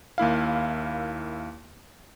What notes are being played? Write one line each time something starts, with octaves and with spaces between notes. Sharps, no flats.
D#2 A#3 E4 F5